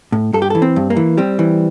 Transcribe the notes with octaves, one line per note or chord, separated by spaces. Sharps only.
A2
G2 A4
G4
E3 A4
C4
G2
A#3
E3
G3 C4
E3